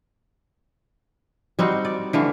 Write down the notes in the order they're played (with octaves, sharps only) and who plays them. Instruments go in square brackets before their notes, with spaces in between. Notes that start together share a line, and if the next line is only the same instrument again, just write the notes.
[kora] G3 C4 D#4 F#4
D5
D3 E3 A3 F5